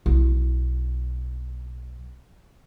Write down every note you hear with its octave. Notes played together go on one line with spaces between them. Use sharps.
B1 E4